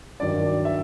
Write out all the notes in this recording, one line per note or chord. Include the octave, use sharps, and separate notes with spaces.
G2 D#3 F#3 D5
E5